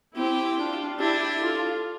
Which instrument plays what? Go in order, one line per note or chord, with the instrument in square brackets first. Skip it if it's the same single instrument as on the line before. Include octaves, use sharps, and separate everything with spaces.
[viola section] C4 E4 [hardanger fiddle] G4
[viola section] D4 F4
[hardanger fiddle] D4 [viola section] E4 G4
[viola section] F4 A4